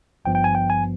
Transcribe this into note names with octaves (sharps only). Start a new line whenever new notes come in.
G#1 G2 F3 B3 G5
G5
G#5
G5
G#5